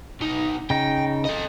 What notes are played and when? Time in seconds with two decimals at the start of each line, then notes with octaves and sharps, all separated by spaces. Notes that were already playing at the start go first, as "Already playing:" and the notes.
0.21 B1 D#4
0.70 C#3 D#4 G5
1.25 A4 D#5